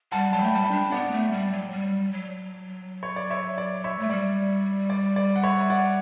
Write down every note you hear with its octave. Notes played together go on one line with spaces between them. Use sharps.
G3 F#5 A5
F#3 A5
G5 B5
A3
G3 A5
G5 B5
D4
B3 D5 F#5
A3
G3
F#3
G3
F#3
C#5
D5
C#5 E5
D5
C#5 E5
A3
G3 D5
D5
D5
F#5
C#5 E5
D5 F#5